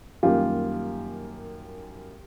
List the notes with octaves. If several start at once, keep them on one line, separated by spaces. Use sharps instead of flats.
F#2 D#3 G3 A#3 F4 G4